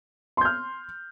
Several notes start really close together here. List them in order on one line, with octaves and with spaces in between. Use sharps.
C6 G6 F6